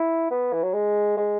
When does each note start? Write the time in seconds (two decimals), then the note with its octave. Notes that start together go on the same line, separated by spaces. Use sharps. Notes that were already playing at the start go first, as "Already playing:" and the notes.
Already playing: E4
0.31 B3
0.52 E3
0.63 F#3
0.73 G#3
1.17 G#3